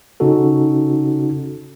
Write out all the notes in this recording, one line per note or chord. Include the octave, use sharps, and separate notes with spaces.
C#3 C#4 D#4 F#4 A4